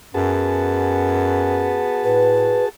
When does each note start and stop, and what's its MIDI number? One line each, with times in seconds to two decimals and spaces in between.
0.14 1.86 42
0.14 2.47 59
0.14 2.69 66
0.14 2.69 68
0.14 2.69 81
2.04 2.60 45
2.04 2.65 71